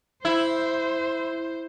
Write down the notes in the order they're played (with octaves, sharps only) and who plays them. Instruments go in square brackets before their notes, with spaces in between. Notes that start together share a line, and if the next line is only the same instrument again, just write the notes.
[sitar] E4 [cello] C5